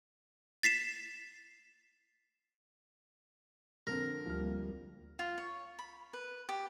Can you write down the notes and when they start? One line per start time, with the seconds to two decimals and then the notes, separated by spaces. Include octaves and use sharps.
0.63 A6 B6 C7 E7
3.87 F2 D3 C4 A#4
4.26 D2 F3 G3 A#3 F6
5.19 F4
5.38 C#5
5.79 B5
6.13 B4
6.49 G4